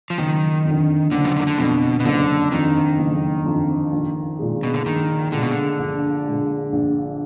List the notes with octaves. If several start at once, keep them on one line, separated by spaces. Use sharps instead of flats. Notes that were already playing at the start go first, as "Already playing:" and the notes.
F3
F#1 D#3
F2 D3
F#1 D3
F3
D#3
D3
F2 B2 D3
B2
F#1 D3
F2 D3 D#3
F#1
F2 D3
A#1
A#2 G#3
B2
D3
A#1 D#3
A#2 D3 G#3
B2
D3
A#1
A#2 G#3
A#1